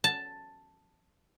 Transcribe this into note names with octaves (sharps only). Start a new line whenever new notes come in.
A5